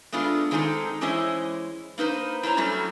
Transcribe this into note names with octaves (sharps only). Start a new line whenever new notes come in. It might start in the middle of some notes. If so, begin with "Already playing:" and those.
G#3 A3 B3 D4 F4
D#3 G#3 C4 D#4 G#4 A4
E3 G#3 C#4 E4 C5 D#5
A#3 D#4 B4 C5
E4 C5 C#5 A#5
F#3 G3 A3 C#4 F#4